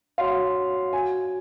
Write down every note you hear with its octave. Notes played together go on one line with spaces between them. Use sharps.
F#4 C#5 F5 F#5 C6
F#4 G#5